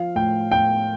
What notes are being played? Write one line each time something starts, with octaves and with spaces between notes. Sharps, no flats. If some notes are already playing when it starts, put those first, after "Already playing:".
Already playing: F3 F5
A2 G5
A2 G5